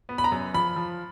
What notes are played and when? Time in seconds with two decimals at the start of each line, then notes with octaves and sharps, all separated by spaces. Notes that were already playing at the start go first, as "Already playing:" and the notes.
0.09 B3
0.18 B5
0.24 A#5
0.32 F#2
0.54 F3 B5
0.76 F3